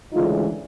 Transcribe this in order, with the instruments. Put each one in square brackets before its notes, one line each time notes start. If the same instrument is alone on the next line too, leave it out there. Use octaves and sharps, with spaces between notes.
[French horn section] D2 C#3 E3 G#3 D#4 F4